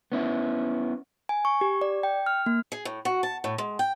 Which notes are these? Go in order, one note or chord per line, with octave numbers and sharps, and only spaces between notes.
B3 C#4 E4
G#5
C#6
G4
D5
G5
F6
A#3
G#4
A2
F#4
A5
A2
G#3
G5